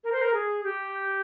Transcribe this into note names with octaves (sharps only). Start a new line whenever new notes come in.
A#4
C5
A#4
G#4
G4